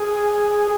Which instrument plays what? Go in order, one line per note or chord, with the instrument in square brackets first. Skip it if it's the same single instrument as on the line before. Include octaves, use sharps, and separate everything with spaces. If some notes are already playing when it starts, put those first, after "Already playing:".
Already playing: [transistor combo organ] G#4